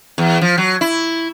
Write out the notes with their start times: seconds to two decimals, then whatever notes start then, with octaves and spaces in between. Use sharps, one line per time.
0.18 E2
0.41 F3
0.58 F#3
0.81 E4